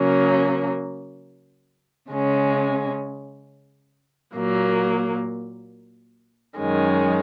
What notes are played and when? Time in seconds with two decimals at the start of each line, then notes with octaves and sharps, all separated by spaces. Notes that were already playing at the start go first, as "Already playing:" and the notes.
Already playing: C#3 F#3 A#3 C#4
2.11 C#3 G#3 C#4
4.35 A#2 F#3 A#3
6.58 F#2 D#3 G#3 C#4